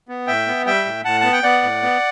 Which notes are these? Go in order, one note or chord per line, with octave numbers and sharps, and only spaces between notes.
B3
A2 E5 G5
B3
G3 E5 G5
A2
A2 F#5 A5
B3 A5
G5
B3 D5 F#5
A2
B3